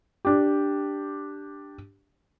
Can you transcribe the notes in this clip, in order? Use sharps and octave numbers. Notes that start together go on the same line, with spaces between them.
D4 G4